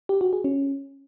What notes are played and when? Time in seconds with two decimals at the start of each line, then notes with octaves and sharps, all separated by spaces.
0.09 G4
0.21 F#4
0.33 G#4
0.44 C#4